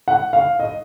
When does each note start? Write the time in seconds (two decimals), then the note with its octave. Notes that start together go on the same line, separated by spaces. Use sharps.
0.08 F#5
0.33 F5
0.60 D#5